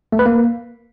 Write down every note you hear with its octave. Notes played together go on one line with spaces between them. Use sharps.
A3
B4
A#3